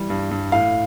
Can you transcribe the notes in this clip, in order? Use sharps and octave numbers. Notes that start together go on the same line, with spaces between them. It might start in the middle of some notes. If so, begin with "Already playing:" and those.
Already playing: E3 G3
G2
G2
A2 F5